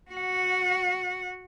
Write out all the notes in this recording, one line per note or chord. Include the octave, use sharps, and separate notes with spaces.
F#4 F#5